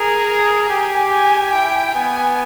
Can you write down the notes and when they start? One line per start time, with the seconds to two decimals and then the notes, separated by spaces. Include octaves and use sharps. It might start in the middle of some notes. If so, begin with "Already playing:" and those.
Already playing: G#4 A#4
0.69 G4 G#5
1.11 G#5
1.53 E4 G5
1.94 B3 G#5